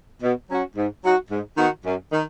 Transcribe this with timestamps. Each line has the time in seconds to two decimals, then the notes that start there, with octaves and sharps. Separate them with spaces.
0.22 B2
0.49 F#3 C#4 F#4
0.76 G#2
1.03 F#3 D#4 F#4
1.30 G#2
1.57 D#3 B3 D#4 F#4
1.85 F#2
2.11 D#3